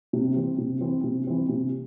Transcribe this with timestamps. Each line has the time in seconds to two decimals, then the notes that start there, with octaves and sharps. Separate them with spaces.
0.13 C3
0.36 E3 C4
0.58 C3
0.81 E3 C4
1.04 C3
1.27 E3 C4
1.49 C3